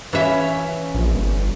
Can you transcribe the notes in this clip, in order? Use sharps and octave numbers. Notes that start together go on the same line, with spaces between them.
E3 C#4 E5
A#1
G1